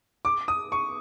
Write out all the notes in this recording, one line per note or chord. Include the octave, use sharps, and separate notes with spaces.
D6
D#6
C#6